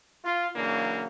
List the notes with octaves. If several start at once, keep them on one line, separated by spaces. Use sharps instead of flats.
F4
C#3 E3 F#3 A#3 D4